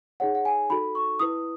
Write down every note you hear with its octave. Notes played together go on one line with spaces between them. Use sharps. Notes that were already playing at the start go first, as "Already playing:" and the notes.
D#4 G#4 C#5 F#5
F#5
G#5
D#4 F#4 A4 B5
C#6
E4 B4 D#6